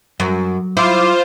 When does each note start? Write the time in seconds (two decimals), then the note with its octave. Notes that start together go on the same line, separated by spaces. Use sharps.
0.20 F#2 F#3
0.77 E4 F4 C5 C6 D6